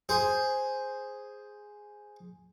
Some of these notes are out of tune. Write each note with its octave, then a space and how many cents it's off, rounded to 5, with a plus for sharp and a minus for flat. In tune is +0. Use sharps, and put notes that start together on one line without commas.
G#4 +0 C5 +0